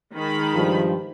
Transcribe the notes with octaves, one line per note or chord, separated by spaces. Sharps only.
D#3 G#3 B5
G2 F3